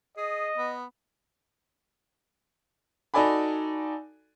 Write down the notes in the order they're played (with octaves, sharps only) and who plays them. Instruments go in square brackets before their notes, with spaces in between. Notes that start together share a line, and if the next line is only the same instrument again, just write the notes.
[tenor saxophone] G#4 [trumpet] D#5
[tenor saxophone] B3
[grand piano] D#4 F#4 A4 D5 G#5 B5